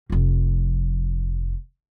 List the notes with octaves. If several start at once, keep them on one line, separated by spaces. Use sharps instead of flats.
F1 F3